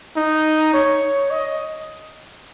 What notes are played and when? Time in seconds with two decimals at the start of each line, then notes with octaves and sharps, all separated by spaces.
0.16 D#4
0.73 C#5
1.31 D#5